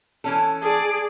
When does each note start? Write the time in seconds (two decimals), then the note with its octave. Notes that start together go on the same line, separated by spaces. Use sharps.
0.24 E3 C#4 A4
0.61 G#4 D5